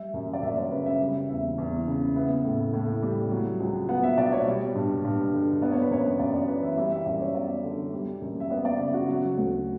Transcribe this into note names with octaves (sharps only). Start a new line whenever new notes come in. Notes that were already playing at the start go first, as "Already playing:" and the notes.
Already playing: G3 E5
F#2
D5
F#2 E5
C#5
C#3 B4
E5
G3
E2 E5
E2
C#3
B3 E5
A2
A2
G3
F#3
C#2
B3 F#5
E5
B2 D5
C#5
G3
G2
G2
D3
B3 D5
C#5
B4
F#2 C#5
F#2 D5
D5
E3 B4
E5
G3 E5
E5
F#2 D5
C#5
B3 D5
D3
G3
F#2
E5
B3 D5
D5
C#3 E5
F#4
F#3
D2